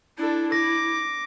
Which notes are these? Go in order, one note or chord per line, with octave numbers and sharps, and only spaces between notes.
D4 E4 A4
D6 A#6